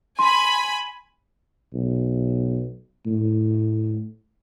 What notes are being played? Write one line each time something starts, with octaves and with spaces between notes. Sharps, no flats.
G#5 B5 C6
B1
A2